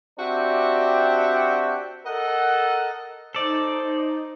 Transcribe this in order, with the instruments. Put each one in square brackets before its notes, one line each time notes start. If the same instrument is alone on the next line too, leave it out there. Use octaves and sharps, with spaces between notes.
[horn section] C4 D4 F#4 G4 E5 G5
A4 A#4 D#5 F#5
[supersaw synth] D#4 [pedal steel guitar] A4 D5 [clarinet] C5